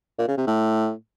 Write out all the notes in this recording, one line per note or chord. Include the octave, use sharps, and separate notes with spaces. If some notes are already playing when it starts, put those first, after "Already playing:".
A#2
C#3
C3
A2